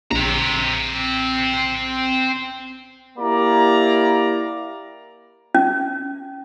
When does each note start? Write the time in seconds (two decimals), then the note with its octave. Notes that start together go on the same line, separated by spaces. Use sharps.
0.11 A#1 C4 A#5
3.19 A#3 E4 G4 D5 A#5
5.55 C#4